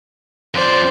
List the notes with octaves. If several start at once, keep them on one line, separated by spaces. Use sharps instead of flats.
F2 C5 D5